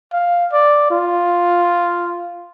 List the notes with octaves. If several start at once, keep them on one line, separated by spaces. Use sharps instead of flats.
F5
D5
F4